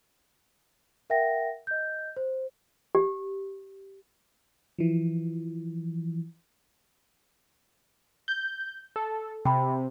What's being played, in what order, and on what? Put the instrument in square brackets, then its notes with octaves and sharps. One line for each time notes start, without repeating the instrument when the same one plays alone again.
[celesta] A#4 E5 F#5 G5 A#6
D#5 G6
C5
[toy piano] G4
[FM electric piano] E3 F3
[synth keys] G6
A4
[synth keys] C3 [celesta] G5 B5